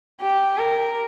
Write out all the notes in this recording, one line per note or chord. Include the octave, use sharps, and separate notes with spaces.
G4
A#4